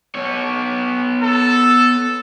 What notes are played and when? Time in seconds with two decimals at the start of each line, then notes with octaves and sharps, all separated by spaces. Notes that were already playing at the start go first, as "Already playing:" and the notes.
0.15 B3 C#5
1.23 A4